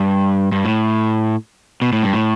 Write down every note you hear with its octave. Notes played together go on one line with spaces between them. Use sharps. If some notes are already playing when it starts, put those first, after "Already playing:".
Already playing: G2
G2
A2
B2
A2
G2
A2